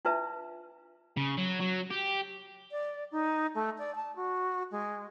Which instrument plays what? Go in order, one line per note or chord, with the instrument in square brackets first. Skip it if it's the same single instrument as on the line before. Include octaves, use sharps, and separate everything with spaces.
[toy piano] D4 E4 F4 B4 E5 A5
[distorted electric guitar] C#3
F#3
F#3
G4
[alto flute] D5
D#4
A3
D5
A5
F#4
G#3